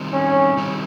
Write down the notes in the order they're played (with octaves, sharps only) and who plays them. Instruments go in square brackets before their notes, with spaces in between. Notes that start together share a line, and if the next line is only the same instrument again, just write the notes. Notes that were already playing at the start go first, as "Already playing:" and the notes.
Already playing: [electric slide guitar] D#3 G3 C4
[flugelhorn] C#4
[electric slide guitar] D#3 G3 C4